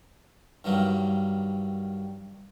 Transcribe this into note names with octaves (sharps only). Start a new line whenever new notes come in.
G2 D#3 F#3 G3 A#3